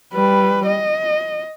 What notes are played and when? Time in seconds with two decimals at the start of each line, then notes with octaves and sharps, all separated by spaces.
0.14 G3 B4
0.66 D#5